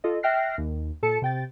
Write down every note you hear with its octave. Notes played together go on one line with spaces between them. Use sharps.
F4 A4 D#5
E5 G5 F6 F#6 A#6 C7
D#2
A#2 A4 A5 C#7
C3 G5 A6